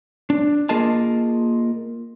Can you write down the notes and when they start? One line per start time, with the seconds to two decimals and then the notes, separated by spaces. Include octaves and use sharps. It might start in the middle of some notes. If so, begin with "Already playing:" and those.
0.30 D4
0.69 A#3 F4 G#4 A#4 D#5 A5